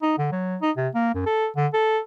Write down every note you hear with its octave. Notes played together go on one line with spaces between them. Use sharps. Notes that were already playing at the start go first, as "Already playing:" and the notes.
D#4
D3
F#3
D#4
C3
A#3
F#2
A4
D3
A4